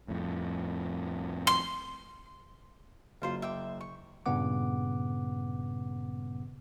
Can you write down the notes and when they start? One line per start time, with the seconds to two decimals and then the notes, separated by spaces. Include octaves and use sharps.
0.08 F2 A2
1.47 C6
3.22 F#1 F#3 F4 C5 F5
3.42 E5 G5 D6
3.81 C#6
4.26 G2 A#2 C#3 B3 F#5 D6